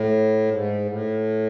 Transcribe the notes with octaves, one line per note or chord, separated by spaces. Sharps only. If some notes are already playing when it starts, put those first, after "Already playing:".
Already playing: A2
G#2
A2